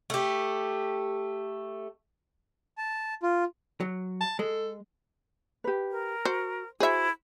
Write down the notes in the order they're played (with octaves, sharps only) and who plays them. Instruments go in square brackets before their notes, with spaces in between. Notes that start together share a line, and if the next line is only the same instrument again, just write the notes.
[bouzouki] A3 G4
[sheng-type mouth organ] A5
F4
[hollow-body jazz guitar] F#3
[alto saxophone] A5
[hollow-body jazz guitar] G#3 [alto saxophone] A4
[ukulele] G4 B4
[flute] A#4
[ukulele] F#4 [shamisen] C5
[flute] E4 [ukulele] F#4 C5 [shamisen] G#4 E5